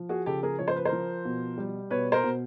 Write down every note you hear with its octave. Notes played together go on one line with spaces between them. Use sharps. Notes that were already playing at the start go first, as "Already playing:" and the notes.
Already playing: F3
F#4 G#4
C#3 G4 A4
G#4 A#4
F3 C#5
C5
B4
A#4 C5
F3
B2
G3
B2 B4 C#5
A#4 C5
B2